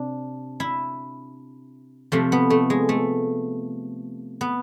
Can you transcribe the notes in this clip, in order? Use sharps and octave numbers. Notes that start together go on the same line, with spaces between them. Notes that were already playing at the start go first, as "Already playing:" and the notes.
Already playing: C3 D4
E4
C3 F3 A3
B3
A3
G#3
A3
B3